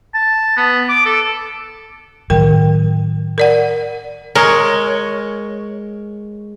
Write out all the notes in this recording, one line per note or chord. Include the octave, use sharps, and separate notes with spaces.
A5
B3
D6
A4
A2 D#3 F#3 A#4 G5
A#4 D5 F#5
G#3 A#4 C#5